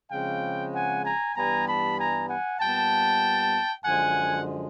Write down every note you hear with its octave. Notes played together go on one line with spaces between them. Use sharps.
C#3 F3 G#3 C4 F5 G5
F#5 G#5
G#5 A#5
G2 E3 G3 B3 G#5 A#5
A5 B5
G#5 A#5
F#5 G#5
A#2 G3 B3 G5 A5
F#2 D3 F3 G#3 F#5 G#5